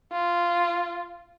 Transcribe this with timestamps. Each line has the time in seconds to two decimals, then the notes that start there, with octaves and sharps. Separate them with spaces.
0.12 F4